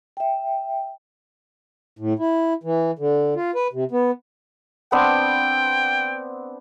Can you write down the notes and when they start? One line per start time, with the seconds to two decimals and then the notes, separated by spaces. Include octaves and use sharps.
0.17 E5 G5
1.99 A2
2.19 E4
2.63 E3
2.99 D3
3.36 F4
3.55 B4
3.73 C3
3.91 B3
4.92 B3 C4 D4 G5